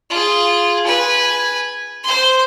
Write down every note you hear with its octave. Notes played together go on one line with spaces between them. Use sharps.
F4 G#4
B4 G#5
C5 C6